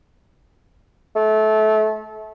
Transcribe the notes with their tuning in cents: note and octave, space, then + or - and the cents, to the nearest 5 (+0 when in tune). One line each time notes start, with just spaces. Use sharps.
A3 -25